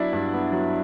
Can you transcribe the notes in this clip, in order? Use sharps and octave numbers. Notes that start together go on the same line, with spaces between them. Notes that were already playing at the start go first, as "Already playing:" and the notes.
Already playing: F#3 B3 D4 E4
G2
B3
F#3